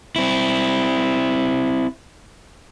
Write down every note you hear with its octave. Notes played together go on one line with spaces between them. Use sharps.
C4 E4